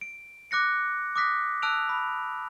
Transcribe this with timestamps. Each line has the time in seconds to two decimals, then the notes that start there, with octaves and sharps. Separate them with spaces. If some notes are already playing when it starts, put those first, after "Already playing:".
0.01 D7
0.51 D6 F#6 A#6 C#7
1.16 D6 D#6 F#6 A#6 B6
1.62 A5 E6 F#6 D7 F7
1.89 B5